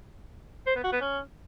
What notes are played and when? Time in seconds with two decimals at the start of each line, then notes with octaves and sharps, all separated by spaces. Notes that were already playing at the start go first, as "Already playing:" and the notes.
0.67 C5
0.75 B3
0.84 F#4
0.92 B3
1.01 C#4